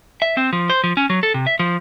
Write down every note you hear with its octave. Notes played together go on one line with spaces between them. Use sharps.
E5
C4
F3
C5
F3
C#4
F#3
A4
C3
E5
F3